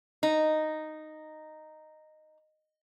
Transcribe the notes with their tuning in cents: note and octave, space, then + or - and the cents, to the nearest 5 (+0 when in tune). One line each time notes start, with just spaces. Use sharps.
D#4 -5